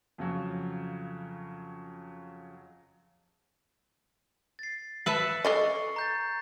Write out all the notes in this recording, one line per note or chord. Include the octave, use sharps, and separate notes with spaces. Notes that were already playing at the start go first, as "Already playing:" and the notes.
F2 C#3 F#3
A6 C7
B4 E5 A5 C#7
A4 D5 D#5 C#6 C7
A#5 G6 A6